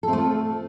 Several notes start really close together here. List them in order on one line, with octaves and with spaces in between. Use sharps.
A4 C4 A3 F4